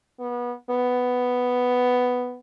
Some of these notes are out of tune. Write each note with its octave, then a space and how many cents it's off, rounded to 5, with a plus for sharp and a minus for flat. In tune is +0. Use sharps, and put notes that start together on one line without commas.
B3 -25
B3 +5